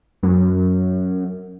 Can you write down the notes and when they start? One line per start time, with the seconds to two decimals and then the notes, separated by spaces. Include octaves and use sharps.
0.23 F#2